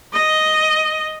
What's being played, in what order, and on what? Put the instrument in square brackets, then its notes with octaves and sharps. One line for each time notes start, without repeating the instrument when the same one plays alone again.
[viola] D#5